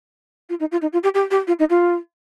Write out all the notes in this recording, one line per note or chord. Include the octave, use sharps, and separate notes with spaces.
F4
D#4
F4
D#4
F4
G4
G4
G4
F4
D#4
F4